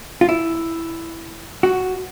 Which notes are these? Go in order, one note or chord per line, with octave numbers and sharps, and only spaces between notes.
F4
E4
F#4